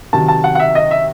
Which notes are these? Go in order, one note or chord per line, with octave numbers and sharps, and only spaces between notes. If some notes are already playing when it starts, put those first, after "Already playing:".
C3 D#3 F#3 A5
A5
F#5
F#5
E5
D#5
E5